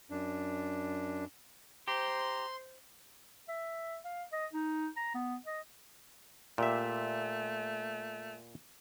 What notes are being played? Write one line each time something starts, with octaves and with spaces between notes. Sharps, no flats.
F#2 D4
G4 C5 A#5 C6
E5
F5
D#5
D#4
A#5
B3
D#5
A#2 A3 G4 E5